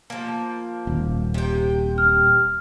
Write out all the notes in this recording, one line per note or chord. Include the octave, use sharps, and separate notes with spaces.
F3 A#3
D#1
C3 G5
F6